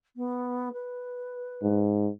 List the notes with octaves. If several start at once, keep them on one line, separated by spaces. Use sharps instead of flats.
B3
B4
G#2